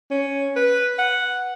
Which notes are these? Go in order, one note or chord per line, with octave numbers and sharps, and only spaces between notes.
C#4
B4
F#5